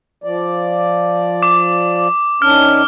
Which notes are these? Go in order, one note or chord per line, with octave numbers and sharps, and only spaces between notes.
F3 D5
D6
D#3 C#4 D4 F6